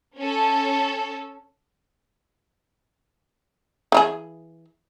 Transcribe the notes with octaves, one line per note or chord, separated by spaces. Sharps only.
C#4 A4
E3 F4 G#4